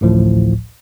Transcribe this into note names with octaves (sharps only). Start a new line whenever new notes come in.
A1 D2 A2 F3